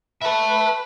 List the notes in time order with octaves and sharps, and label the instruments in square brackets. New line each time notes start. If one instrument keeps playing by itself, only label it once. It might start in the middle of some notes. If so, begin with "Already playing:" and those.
[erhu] B4 [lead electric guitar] E5 A5